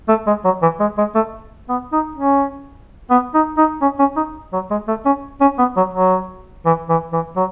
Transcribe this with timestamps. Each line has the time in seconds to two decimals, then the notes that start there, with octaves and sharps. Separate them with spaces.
0.08 A3
0.27 G#3
0.44 F#3
0.62 E3
0.80 G#3
0.98 G#3
1.15 A3
1.69 B3
1.92 D#4
2.16 C#4
3.10 B3
3.34 D#4
3.57 D#4
3.81 C#4
3.99 C#4
4.16 D#4
4.53 F#3
4.70 G#3
4.88 A3
5.06 C#4
5.41 C#4
5.59 B3
5.76 F#3
5.94 F#3
6.66 E3
6.89 E3
7.12 E3
7.36 F#3